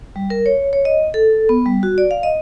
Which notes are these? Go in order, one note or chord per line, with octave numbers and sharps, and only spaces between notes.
G3
A#4
C#5
C#5
D#5
A4
B3
G3
F#4
D5
F5
D#5